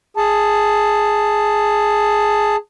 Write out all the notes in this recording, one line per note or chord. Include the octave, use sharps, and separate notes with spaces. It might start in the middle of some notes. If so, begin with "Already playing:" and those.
G#4 A5